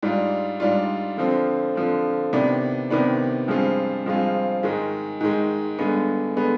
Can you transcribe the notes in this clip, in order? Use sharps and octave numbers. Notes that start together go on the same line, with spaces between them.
G#2 G3 D4 F4
G#2 G3 D4 F4
D3 F3 C4
D3 F3 C4
C3 D#3 B3 D4
C3 D#3 B3 D4
G2 F3 G#3 C4 F4
G2 F3 G#3 C4 F4
G#2 D#3 G#3
G#2 D#3 G#3
G2 D3 G#3 B3
D3 G#3 B3